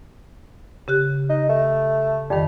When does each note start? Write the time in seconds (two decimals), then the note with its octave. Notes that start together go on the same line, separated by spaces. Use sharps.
0.88 C#3 G4 F#6
1.29 D#4
1.49 A3
2.30 F2 D#3 G3